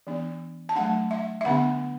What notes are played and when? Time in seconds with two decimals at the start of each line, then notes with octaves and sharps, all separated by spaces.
0.07 E3 B3 D4
0.69 A5
0.76 F#3 A3 D4 F#5
1.11 E5
1.41 E5
1.45 D3 B3 D4 F#5